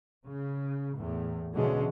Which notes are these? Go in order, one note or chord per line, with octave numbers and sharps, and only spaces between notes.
C#3
E2 A2
B2 D3 E3 G#3 C#4